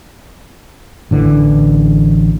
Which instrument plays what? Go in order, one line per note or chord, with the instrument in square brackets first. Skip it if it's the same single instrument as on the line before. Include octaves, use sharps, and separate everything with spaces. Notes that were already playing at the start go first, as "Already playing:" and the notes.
[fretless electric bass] A1 D3 E3